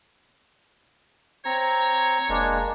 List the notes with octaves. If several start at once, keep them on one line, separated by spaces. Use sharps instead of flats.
C4 C#5 A#5
F1 G#3 A#3 D4